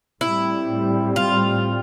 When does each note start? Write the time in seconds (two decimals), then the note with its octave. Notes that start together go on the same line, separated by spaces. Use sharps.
0.21 A2 G3 C4 E4
1.16 F4